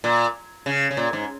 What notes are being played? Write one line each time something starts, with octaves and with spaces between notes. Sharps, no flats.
A#2
C#3
C#3
A#2
G#2